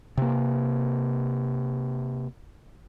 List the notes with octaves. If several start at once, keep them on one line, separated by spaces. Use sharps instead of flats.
C3 A#3